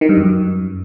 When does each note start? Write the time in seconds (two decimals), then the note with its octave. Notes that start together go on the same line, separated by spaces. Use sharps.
0.01 D#3
0.09 G2
0.17 F#2